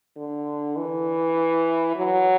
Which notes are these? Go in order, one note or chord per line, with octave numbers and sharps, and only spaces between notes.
D3
E3
F#3